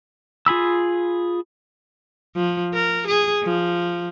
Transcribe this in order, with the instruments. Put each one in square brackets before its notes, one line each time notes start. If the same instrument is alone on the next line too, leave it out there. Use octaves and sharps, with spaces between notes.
[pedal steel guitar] F4 G#4 B5 E6
[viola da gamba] F3
A#4
G#4
F3